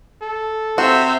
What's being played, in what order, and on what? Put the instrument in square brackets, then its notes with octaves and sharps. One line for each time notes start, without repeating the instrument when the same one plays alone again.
[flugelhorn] A4
[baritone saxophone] C3 [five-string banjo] F#4 [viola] C5 E5